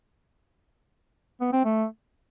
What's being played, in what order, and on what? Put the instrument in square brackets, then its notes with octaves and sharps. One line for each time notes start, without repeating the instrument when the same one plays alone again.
[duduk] B3
C4
A3